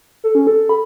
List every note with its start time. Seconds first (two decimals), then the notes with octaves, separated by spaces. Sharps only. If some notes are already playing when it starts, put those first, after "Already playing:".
0.24 A4
0.35 C#4
0.47 A4
0.69 B5